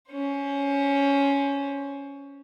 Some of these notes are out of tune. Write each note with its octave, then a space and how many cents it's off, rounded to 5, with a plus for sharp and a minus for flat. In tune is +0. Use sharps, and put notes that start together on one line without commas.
C#4 +10 C5 +20